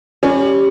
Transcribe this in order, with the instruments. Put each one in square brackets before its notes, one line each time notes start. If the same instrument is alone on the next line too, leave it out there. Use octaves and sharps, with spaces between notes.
[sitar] G3 [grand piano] C#4